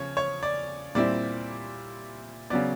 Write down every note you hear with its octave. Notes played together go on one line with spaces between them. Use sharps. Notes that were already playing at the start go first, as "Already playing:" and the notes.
Already playing: C#3 F3 C#5
C#5
D5
A#2 G3 C4 E4 D5
C#3 F#3 B3 D5